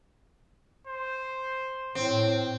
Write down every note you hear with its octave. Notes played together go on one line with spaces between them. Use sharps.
C5
A2 C4